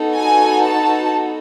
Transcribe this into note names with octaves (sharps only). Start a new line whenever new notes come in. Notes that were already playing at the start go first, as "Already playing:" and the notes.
Already playing: B3 D#4 F#4 A4
G#5
A5